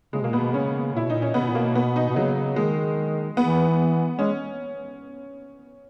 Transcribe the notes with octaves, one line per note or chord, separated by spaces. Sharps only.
C#3 G#3
B2 A#3
A#2 B3
B2
C#3 C#4
A#2 E4
B2
A#2 D#4
C#4
C#3 B3
B2
A#2
B2 A#3
B3
D#4
B2
C#3 F#3
D#3 G#3
E3 B3
G#3 C#4